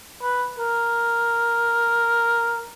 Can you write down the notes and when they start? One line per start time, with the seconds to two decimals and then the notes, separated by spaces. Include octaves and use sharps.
0.22 B4
0.58 A#4